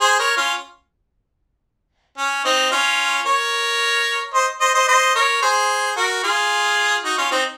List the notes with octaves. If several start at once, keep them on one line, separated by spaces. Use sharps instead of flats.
G#4 C5
A#4 C#5
C#4 F4
C#4
C4 D#4
C#4 F4
A#4 C#5
C5 D#5
C5 D#5
C5 D#5
C5 D#5
A#4 C#5
G#4 C5
F#4 A#4
F4 G#4
D#4 F#4
C#4 F4
C4 D#4